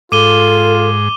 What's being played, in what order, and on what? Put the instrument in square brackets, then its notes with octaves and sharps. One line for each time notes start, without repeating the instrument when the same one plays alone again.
[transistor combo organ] G#2 [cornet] F4 [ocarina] A4 [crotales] D6 D#7 G7